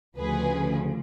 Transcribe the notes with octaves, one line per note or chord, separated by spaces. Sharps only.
D2 C#3 F3 G#4 B4